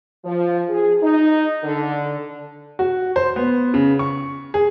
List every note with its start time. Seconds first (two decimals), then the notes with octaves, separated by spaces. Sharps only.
0.24 F3
0.68 G#4
1.01 D#4
1.63 D3
2.79 F#4
3.16 C5
3.36 B3
3.74 C#3
3.99 C#6
4.54 G#4